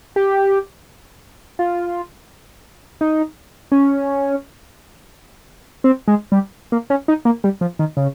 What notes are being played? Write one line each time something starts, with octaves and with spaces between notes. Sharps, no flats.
G4
F4
D#4
C#4
C4
G#3
G3
A#3
C#4
D#4
A#3
G3
F3
D#3
C#3